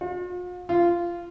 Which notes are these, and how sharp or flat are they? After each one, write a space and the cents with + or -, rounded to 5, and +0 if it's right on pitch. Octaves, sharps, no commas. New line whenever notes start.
F4 +45
F4 -15